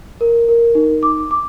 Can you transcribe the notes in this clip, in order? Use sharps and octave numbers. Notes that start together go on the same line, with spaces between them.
A#4
A#4
D#4
D6
D6